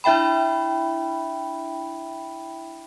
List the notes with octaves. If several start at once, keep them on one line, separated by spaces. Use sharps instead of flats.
D4 E4 E5 G5 B5